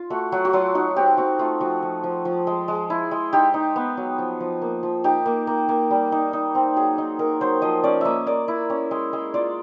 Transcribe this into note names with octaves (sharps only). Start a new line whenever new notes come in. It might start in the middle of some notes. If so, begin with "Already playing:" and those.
Already playing: F4
A3 F#4
F#3 F#4
F#4
F#3 F4
D#4 F#4
C4 G4
C4 F#4
A3 F4
F3 F#4
F3
F3
F3
G#3
G#3
E4
G#3
D#4 G4
D#4
B3
F#3
F3
F3
A#3
F3
D#4 G4
A#3
A#3
A#3
G3
D#4
D#4
C4
F#3 G#4
D#4
D#4 A#4
F#3 C5
F3 D#5
C#4 D5
A#3 D#5 E5
A#3 D5
E4
C#4
G#3
G#3
F4 D5